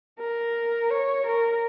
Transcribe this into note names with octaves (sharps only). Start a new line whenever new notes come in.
A#4
C#5
A#4